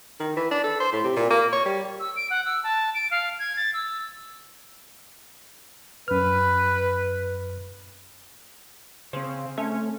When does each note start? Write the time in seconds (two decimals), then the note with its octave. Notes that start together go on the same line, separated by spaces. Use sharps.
0.20 D#3
0.36 E3
0.51 D4
0.64 A4
0.80 C5
0.93 A2
1.04 C3
1.16 A#2
1.30 A#3
1.53 C#5
1.65 G3
2.00 E6
2.16 D7
2.30 F#5
2.45 E6
2.64 A5
2.95 D7
3.11 F5
3.39 G#6
3.57 A6
3.74 E6
6.08 F#2 B4 F6
9.13 C#3 C4 C5
9.58 A3 C#4